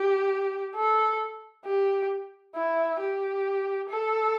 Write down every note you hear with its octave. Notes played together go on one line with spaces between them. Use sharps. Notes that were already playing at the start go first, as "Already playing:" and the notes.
Already playing: G4
A4
G4
E4
G4
A4